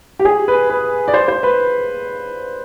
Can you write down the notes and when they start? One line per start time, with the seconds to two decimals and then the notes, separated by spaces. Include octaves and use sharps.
0.19 G4
0.25 G#4
0.48 B4
0.70 B4
1.08 D5
1.14 C5
1.28 C5
1.43 B4